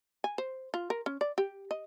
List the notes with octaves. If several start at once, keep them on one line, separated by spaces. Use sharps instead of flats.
G#5
C5
F4
A#4
C#4
D5
G4
D#5